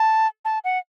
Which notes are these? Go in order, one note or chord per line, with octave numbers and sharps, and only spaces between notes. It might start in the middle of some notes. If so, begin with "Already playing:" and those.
Already playing: A5
A5
F#5